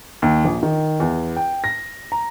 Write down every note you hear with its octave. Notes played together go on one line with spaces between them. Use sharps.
D#2
A#1
D#3
E2
G5
A#6
A#5